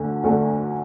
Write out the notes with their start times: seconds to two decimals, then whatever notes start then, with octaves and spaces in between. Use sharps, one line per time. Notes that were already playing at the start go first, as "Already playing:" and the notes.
Already playing: D2 D3 A3
0.23 D2 D3 A3